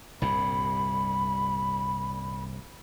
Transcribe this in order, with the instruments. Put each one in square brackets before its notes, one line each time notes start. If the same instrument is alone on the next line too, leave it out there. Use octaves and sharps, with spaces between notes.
[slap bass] C2 G2 A#2 [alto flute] B5